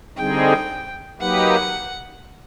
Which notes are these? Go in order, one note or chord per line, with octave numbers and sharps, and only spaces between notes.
D3 G3 C4 D#4 G#4 G5
F#3 A#3 D#4 G4 B4 F#5